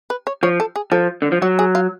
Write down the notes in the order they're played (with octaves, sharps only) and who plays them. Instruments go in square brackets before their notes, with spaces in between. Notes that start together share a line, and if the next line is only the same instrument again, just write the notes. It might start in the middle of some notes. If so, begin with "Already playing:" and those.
[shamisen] B4
C#5
[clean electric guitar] F3 [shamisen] C#5
[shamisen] A4
G#4
[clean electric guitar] F3 [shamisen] A4
[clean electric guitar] D3
F3
[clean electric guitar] F#3 [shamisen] F#4
[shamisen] G#4
F4